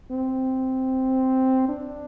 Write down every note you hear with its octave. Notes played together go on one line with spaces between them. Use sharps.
C4
D4